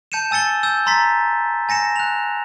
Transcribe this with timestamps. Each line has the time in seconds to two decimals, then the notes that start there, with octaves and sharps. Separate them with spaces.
0.12 A5 G6 C#7 D#7 E7
0.31 G#5 E6 A6 C#7 G7
0.63 E6 G6
0.86 A#5 C6 A6 B6
1.69 G#5 A#6 C#7 E7
1.96 F#6 F7